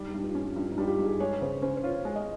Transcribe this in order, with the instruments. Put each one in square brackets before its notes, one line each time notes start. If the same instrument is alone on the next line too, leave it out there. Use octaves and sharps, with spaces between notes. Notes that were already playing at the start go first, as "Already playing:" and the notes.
Already playing: [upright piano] G3 [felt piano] D#4
[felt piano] G4
[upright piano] G2
[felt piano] F4
[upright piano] C#4
[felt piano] F4
[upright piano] G2 [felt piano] F4
[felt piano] D#4
[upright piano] G3 [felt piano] F4
[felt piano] G4
[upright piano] G2
[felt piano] G#4
[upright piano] G#3 [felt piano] C#5
[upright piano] C#3 [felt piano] C5
[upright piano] C#4 [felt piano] C5
[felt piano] C5
[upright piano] F4 [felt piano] C#5
[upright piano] G#3
[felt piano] D#5